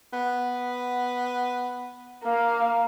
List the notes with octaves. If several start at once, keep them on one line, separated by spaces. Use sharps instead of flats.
B3
A#3 F5